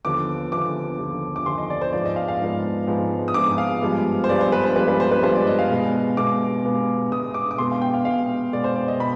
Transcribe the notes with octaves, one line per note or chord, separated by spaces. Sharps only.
D#2 D3 F3 B3 D6
D#2 D3 F3 B3 D6
D#2 D3 F3 B3
D6
D#2 D3 F3 B3 C6
D#5
D5
C5
G#2 F3 G#3 B3 D5
D#5
F5
F5
G#2 F3 G#3 B3
G#2 F3 G#3 B3
D#6
G#2 F3 G#3 B3 D6
F5
G2 F3 G#3 B3
C5
G2 F3 G#3 B3 D5
C5
B4
C5
G2 F3 G#3 B3 B4
B4
C5
B4
G2 F3 G#3 B3 C5
D5
D#5
F5
B2 G#3 B3
B2 G#3 B3 D6
B2 G#3 B3
B2 G#3 B3 D#6
D6
D6
B2 G#3 B3 C6
F5
G5
F5
B2 G#3 B3 F5
B2 G#3 B3 D5
C5
D5
D#5
B2 B5